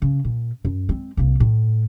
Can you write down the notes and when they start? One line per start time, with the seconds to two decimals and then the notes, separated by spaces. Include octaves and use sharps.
0.02 C#3
0.25 A#2
0.65 F#2
0.89 G#3 C4
1.17 C2 A#3
1.40 A2